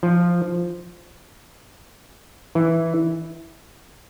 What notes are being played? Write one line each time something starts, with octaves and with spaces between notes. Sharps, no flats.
F3
E3